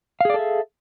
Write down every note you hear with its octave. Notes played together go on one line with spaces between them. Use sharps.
G#4 A4 D5 E5 F5